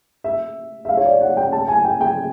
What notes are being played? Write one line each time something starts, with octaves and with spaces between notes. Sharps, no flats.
E5
E5
F5
C#5
D5
F#5
G5
A5
G#5
G5
G5